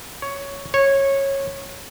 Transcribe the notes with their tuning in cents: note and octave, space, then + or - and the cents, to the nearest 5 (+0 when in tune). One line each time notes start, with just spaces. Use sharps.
C#5 +10
C#5 -15